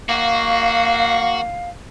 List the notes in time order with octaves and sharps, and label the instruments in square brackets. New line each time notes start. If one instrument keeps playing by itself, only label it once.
[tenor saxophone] A#3 [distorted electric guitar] F#4 [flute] F5